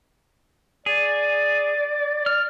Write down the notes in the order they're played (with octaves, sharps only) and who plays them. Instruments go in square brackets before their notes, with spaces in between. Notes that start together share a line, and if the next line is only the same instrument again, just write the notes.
[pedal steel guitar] G#4 [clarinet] D5
[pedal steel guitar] F6